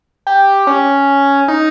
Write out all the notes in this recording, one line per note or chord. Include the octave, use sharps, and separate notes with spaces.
G4
C#4
D#4